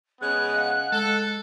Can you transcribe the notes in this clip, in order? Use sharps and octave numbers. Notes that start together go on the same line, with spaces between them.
C#3 G#3 B3 F#6
D#5 F5 F#5
G#3 A4